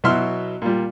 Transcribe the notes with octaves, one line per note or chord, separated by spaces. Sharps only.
B2 F#3 E4 E5 C6 F6
A#2 G3